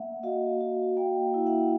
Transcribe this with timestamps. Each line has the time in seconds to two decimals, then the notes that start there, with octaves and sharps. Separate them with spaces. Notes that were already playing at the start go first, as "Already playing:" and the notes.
Already playing: A#3 E5 F#5
0.23 F#4 D#5 F5
0.61 F#4
0.97 A#3 F5 G5
1.34 E4
1.46 E5 F#5